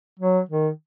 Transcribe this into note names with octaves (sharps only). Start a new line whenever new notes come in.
F#3
D#3